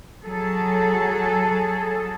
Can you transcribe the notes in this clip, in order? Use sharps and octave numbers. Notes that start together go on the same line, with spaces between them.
F#3 G#4 A4